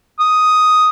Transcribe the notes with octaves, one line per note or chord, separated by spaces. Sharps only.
D#6